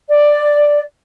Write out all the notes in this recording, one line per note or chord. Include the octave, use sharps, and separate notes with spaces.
D5